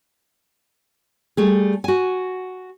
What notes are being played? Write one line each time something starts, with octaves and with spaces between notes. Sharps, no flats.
G3 A3 G#4
F#4 G#5